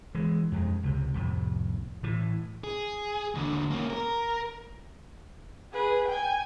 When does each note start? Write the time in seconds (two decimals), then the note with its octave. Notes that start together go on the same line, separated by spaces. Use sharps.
0.15 E3 G#3
0.52 F2 G#3
0.83 C#2 C3
1.14 C2 F2 A2
2.03 A2 E3
2.64 G#4
3.35 D#2 D3
3.71 A#3 C#4
3.90 A#4
5.73 G#4 B4
6.07 G5 G#5